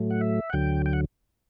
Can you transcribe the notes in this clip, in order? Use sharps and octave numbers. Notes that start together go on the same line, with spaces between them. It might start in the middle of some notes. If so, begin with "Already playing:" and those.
Already playing: A2 F#3 A3
F#5
E5
F#5
D2 D3 F#3 G5
G5
F#5